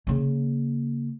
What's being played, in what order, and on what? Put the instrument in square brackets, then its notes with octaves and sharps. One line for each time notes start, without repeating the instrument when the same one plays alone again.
[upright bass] C#3 A#3